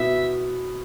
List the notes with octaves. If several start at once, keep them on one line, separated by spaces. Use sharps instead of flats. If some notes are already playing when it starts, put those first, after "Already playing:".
Already playing: B2 B3 E4 E5